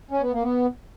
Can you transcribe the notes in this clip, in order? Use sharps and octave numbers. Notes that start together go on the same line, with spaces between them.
C#4
B3
A#3
B3